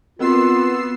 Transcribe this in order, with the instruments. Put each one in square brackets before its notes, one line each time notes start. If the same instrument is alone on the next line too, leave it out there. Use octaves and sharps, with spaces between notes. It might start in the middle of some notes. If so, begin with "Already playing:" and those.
[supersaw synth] B3 E6 C7 [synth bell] C4 F#4 A#4 [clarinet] F4